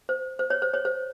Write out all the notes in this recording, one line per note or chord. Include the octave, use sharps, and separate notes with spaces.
C5
C5
C#5
C5
C#5
C5